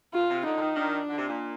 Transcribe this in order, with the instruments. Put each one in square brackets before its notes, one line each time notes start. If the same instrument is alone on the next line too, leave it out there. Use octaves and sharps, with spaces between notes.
[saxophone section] A#2 [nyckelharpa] F4
[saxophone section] C3
[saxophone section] D3 [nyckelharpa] D#4
[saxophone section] D3
D#3
[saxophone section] D#3 [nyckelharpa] D4
[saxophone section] D3
C3
A#2